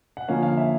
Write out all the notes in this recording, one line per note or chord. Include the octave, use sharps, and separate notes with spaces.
F#5
D3 F3 A#3 C#4 F5
F5
E5